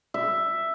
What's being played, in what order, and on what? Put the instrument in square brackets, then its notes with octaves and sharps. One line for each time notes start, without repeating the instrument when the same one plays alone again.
[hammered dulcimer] E5